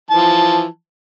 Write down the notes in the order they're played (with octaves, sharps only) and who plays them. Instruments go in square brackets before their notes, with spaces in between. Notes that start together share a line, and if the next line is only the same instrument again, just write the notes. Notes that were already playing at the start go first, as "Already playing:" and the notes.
[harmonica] E3 F3 A5